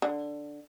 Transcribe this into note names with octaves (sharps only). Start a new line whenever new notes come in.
D3